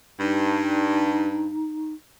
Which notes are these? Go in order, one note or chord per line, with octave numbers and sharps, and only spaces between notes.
G2 D#4